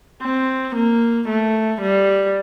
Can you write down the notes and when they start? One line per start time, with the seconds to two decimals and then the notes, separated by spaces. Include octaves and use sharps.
0.23 C4
0.75 A#3
1.28 A3
1.82 G3